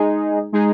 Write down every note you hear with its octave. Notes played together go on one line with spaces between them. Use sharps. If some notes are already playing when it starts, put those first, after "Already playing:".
Already playing: G#3 D#4 G#4
G#3 D#4 G#4